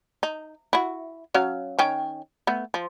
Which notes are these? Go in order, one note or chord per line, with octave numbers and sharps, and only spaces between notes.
D#4
E4 F#4
F#3 C#4 F5
D#3 C#4 G5
A3 B3
F3